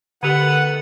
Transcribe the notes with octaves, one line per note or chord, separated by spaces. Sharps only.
D3 D#3 A3 B3 G4 F#5